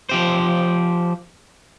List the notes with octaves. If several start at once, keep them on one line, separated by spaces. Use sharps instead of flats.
F3 G4 C5